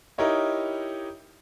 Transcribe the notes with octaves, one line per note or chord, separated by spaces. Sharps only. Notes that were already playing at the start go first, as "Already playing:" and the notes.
D#4 E4 G4 A#4 C#5 D#5